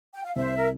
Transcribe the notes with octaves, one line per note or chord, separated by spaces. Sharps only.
G5
F5
C2 C5 E5
A#4